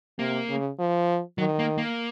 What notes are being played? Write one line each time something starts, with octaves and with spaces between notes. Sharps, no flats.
C3 A#3
C#3
F3
D#3 F#3
A#3
A#3